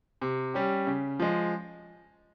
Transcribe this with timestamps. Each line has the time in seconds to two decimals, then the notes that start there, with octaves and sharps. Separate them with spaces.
0.21 C3
0.54 G3 C#4 G4
0.87 C#3
1.20 F3 G#3